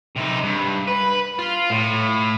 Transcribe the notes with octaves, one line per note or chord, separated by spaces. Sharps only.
C3 D#4
G2
B4
F4
A2